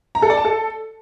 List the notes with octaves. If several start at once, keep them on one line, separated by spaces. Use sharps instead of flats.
A#5
A4
D5
A5
A4